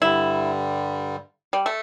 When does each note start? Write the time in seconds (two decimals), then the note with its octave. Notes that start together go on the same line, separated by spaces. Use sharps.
0.02 G2 D3 G3 E4
1.53 G3
1.66 A3